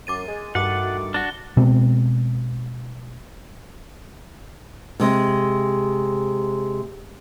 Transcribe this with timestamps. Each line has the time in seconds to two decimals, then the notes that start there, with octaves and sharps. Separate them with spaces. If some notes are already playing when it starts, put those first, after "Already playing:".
0.07 F#2 D6 A6 D#7
0.27 G#3
0.55 G2 D#3 A3 F#4 F#5 D6 A6
1.14 D4 F#4 G7
1.57 B2 G#3 C4
5.00 C3 G#3